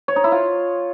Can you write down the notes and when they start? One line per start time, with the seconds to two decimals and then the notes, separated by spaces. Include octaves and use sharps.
0.08 C#5
0.16 D#4
0.24 E4
0.32 F4